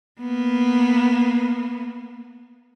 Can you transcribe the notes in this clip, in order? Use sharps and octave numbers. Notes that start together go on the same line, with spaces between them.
A#3 B3